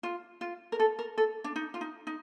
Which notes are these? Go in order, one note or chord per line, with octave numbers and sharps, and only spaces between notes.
F4
F4
A#4
A4
A#4
A4
D4
D#4
F4
D#4
D#4